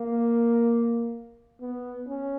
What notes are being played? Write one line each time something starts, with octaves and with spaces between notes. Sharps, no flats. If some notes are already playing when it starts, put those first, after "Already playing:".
Already playing: A#3
B3
C#4